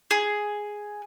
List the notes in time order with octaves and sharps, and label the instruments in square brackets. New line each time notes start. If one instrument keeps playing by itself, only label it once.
[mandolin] G#4